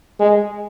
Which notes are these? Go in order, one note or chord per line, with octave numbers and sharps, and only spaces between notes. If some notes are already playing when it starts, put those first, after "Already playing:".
G#3